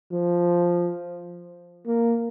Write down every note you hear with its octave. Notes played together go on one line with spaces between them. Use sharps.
F3
A#3